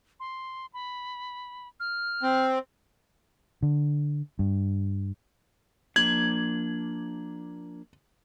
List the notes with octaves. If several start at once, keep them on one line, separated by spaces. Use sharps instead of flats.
C6
B5
F6
C4
D3
G2
F3 A#3 D4 G#6 F#7